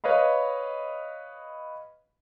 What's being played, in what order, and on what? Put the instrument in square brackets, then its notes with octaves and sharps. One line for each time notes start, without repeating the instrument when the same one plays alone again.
[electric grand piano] B4 C#5 D#5 F5 B5